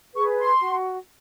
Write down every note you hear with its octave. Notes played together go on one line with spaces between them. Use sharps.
G#4 B4 C#6
C6
F#4